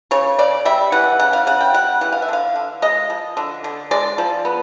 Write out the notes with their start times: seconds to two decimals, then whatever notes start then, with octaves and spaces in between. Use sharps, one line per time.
0.11 C#3 C#5
0.38 C#3 D5
0.65 G3 E5
0.92 E3 F#5
1.19 C#3 F#5
1.33 F5
1.47 C#3 F#5
1.61 G5
1.74 G3 F#5
2.01 E3 F#5
2.12 F5
2.22 E5
2.28 D3 F5
2.56 D3
2.82 G#3 D#5
3.10 F3
3.37 D3
3.64 D3
3.91 G#3 D5
4.18 F3
4.45 B3